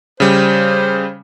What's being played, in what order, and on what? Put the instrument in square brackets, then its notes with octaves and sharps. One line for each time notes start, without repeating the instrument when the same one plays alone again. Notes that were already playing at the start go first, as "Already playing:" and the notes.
[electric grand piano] C#3 G3 [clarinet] C5